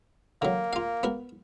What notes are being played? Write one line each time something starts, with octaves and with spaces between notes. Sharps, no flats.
D3 F#3 A#3
F4 F5
B3 F#4 A#4